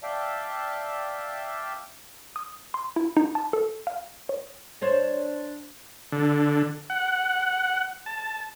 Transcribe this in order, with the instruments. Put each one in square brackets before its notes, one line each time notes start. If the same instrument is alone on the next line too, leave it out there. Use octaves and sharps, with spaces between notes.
[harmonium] D5 E5 F5 G5 A5
[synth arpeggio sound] D#6
C6
E4
D#4
A5
A4
F5
C#5
[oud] D4 C5 C#5
[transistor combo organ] D3
F#5
A5